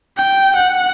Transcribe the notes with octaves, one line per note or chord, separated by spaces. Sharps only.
G5
F#5